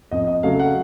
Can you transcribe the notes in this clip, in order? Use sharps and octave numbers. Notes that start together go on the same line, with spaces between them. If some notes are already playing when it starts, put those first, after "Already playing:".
F2 D#5
D#5
C#3 F#3 A3 F5
F#5